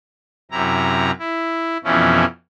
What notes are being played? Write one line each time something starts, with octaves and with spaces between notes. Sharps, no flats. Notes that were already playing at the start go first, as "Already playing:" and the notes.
F#2 C3 E4 A#5
E4
F2 B2 E3 F3 C#4 E4